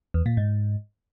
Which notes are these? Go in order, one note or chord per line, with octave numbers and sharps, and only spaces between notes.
E2
A#2
G#2